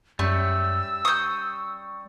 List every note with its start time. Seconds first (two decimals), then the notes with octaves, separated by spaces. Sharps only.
0.19 F#2 G3 A3 C#4 E6
1.05 C#6 D#6 G6